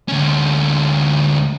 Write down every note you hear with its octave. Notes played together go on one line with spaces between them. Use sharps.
D2 C#4